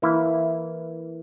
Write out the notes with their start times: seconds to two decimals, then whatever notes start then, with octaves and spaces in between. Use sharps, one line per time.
0.02 E3 A#3 E4